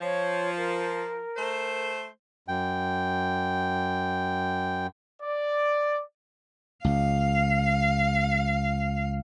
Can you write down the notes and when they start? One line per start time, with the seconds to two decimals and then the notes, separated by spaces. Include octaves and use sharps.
0.01 F3 C#5
0.57 A#4
1.37 A3 C5
2.48 F#2 G5
5.23 D5
6.84 C#2 F5